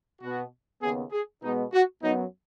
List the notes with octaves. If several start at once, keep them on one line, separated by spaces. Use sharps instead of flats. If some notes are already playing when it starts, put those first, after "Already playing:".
B2 B3 F#4
D#2 C#3 B3 G#4
G#4
B2 G#3 B3 D#4
F#4
F#2 F#3 B3 D#4